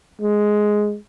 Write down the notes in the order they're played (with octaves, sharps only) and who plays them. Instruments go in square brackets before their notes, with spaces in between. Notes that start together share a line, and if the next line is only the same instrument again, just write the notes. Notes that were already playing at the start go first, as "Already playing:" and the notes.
[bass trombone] G#3